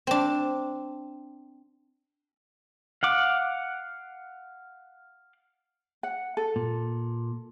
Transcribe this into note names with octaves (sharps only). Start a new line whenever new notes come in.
C4 D4
F5 F#5 D6
F#5
A4
A#2